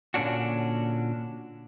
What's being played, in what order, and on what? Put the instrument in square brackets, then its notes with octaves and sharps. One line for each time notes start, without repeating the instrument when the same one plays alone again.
[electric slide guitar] A#2 D3 C#4 D4 F#4